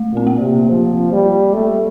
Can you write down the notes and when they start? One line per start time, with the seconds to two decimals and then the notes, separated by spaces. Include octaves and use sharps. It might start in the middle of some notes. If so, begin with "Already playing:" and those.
Already playing: A3
0.12 A#2 C4
0.27 A#3
0.41 C3
0.69 F3
1.12 G3
1.54 A3